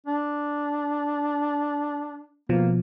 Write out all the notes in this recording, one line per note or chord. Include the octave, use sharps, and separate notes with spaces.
D4
B2 F3 A#3